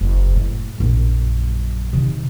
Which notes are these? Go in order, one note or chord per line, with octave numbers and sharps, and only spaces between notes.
F#1
A2
A#1 F#2
C3 D#3